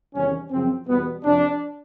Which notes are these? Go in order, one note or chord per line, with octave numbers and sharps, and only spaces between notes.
E2 C3 D#3 G3 C#4
F#2 C#3 F3 C4
E2 B2 G3 B3
F2 C3 F3 D4